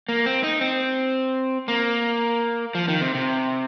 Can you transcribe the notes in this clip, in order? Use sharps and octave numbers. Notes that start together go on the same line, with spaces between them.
A#3
C4
D#4
C4
A#3
F3
D#3
C3
C3